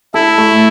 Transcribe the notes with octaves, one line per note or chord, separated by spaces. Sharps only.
E4 A4
A3